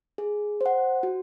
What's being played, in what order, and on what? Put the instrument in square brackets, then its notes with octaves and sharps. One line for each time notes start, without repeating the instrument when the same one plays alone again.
[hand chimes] G#4
C5 F#5
F#4